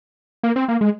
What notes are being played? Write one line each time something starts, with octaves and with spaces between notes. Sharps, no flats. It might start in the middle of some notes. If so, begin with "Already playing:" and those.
A#3
C4
A#3
G#3